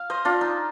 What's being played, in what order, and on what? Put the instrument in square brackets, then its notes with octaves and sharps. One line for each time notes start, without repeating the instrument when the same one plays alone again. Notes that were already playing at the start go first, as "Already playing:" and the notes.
Already playing: [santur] F5
C5 D#5
D4 F4
D#4